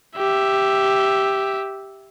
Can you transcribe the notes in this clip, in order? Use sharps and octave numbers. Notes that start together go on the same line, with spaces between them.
G4 E5